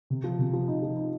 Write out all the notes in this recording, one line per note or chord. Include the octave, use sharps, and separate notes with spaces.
C3
F3
C3
F3
D#4
F3
D#4